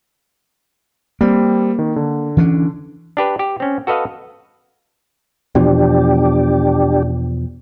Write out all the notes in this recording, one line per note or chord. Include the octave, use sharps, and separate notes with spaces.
G3 A#3 C4
D#3
D3
E3 C#4 D4
D4 G4 B4
G4
C4 C#4
F#4 A4 B4 D#5 F5
E2 B2 F3 D4 G4